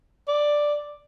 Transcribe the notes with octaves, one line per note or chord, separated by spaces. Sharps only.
D5